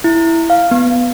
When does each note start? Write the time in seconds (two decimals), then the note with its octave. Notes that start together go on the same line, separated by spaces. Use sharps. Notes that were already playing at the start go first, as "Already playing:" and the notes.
0.04 E4
0.50 F5
0.71 B3